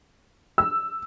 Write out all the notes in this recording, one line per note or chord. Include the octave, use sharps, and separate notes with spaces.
E6